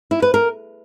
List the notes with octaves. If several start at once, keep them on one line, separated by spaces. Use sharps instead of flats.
E4
B4
A#4